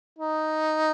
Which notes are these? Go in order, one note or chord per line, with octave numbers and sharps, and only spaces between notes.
D#4